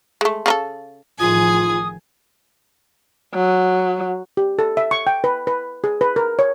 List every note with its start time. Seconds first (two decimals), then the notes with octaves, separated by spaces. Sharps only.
0.21 G#3 A3
0.46 C#3 D#4 A4
1.19 A1 D#3 F3 F4 G#4 G#5 D#6
3.34 F#3
4.37 G4
4.59 A4
4.77 E5
4.91 C#6
5.07 G5
5.24 B4
5.47 B4
5.84 G#4
6.01 B4
6.16 A#4
6.39 C#5